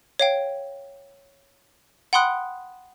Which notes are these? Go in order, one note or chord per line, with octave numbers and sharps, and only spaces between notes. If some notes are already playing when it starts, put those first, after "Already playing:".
C#5 F5 G5
F#5 G5 B5 C6 D#6 F#6